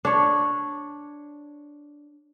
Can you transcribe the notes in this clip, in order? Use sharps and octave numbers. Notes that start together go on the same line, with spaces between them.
D4 C#5